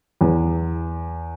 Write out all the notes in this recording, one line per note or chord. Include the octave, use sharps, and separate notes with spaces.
E2